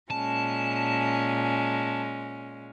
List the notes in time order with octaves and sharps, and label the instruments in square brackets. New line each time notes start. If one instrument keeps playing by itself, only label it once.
[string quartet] A#2 G#3 C#4 [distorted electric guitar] A5